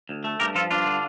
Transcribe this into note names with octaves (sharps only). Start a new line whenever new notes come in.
D2
A3
G2 G4 A#4
F3 F4 A4
G2 D4 F4
D3